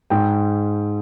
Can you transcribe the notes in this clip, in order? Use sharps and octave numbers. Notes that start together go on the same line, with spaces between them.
G#2 G5